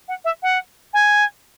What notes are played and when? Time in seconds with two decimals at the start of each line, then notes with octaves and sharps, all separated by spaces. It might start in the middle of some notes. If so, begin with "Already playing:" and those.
0.08 F#5
0.25 E5
0.43 F#5
0.93 G#5